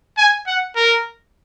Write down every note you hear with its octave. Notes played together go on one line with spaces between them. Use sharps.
G#5
F#5
A#4